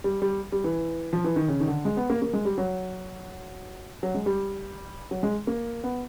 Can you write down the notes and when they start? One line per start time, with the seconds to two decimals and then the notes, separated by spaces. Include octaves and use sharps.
0.04 G3
0.22 G3
0.52 G3
0.64 E3
1.13 F3
1.24 E3
1.36 D#3
1.48 C#3
1.60 D#3
1.67 D3
1.85 G#3
1.97 B3
2.10 A#3
2.22 A#3
2.33 G#3
2.45 G3
2.58 F#3
4.03 F#3
4.15 G#3
4.26 G3
5.11 F#3
5.23 G#3
5.47 A#3
5.84 B3